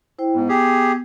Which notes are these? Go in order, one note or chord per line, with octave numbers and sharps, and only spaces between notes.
E4 C5 G5
G#2 B3
G4 G#4